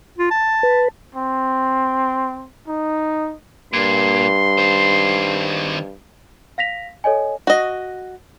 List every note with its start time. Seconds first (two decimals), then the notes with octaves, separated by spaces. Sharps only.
0.18 F4
0.31 A5
0.63 B4
1.15 C4
2.68 D#4
3.73 G2 A#2 C6
4.58 D#3 C5
6.58 F5 A#6 B6 F7
7.04 A4 C#5 D#5 G#5
7.47 F#4 D#5